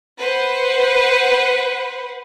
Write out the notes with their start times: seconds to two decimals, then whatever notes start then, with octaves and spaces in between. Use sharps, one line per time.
0.18 B4 C5 F#5